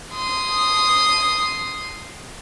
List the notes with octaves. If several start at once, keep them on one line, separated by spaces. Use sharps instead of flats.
C6 D#6